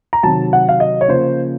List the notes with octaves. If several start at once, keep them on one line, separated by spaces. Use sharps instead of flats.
A#5
C3 D#3 F#3 A5
F#5
F5
D#5
C#5
C#3 F3 A#3 C5